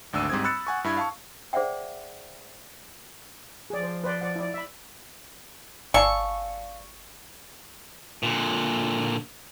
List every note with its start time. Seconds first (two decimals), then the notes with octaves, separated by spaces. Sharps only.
0.13 G#1 D2 D4 E6 D#7
0.30 G#2 G3 C4 D#6 G#6
0.44 B5 E6 F#6 A6 C#7
0.67 F#5 G#5 C#6
0.84 G2 E4 B5 G#6
0.97 F5 A5 C#6
1.53 G#4 C5 D5 E5 F#5 G5
3.70 F3 G#4 D5
3.83 C5
4.04 B4 C5 D5
4.21 D5 F#5
4.36 E4 D5
4.54 E5 B5
5.94 G1 D5 F5 G#5 A5 C#6 E6
8.23 A#2 D3